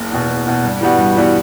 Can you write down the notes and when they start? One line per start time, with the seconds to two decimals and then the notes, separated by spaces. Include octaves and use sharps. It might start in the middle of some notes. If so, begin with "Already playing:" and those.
Already playing: F#1
0.11 E2 B2
0.28 F#1
0.46 E2 B2
0.63 G2
0.81 E3 G3 B3 F#4
0.98 G2
1.16 E3 G3 B3 F#4